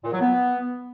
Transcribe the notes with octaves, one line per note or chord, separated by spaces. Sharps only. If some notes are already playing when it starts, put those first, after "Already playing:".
A#2
F#3
B3